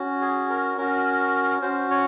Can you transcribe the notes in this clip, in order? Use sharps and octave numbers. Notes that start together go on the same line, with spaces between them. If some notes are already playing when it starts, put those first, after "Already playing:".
Already playing: C#4 F#4
G#4
A#4
C#4 F#4 A#4
C#4 F#4 C5
C#5